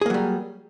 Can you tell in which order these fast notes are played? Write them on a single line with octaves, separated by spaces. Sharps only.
G#4 A#3 F#3 G3